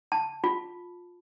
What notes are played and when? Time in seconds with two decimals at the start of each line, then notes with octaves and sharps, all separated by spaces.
0.12 A5
0.44 F4